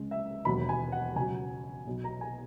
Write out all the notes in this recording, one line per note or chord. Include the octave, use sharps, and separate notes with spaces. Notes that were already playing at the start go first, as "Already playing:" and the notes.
Already playing: C#2 C#3 G#3
E5
E1 D#2 D#3 F#3 B5
G#5
F#5
C#2 B2 F#3 G#5
B1 B2 F#3
A#5
G#5